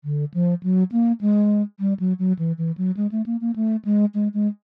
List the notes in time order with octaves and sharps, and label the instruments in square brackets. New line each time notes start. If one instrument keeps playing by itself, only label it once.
[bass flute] D3
F3
F#3
A#3
G#3
G3
F#3
F#3
E3
E3
F#3
G#3
A3
A#3
A#3
A3
G#3
G#3
G#3